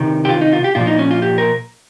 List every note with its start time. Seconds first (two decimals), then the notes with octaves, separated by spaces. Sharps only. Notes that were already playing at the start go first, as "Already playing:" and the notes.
Already playing: C3 D#3
0.25 G4
0.29 F4
0.41 D#4
0.53 F4
0.64 G4
0.75 A#2 F3 F4
0.87 D#4
0.99 C#4
1.11 F4
1.22 G4
1.38 A#4